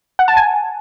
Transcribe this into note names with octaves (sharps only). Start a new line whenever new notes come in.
F#5
A5
G#5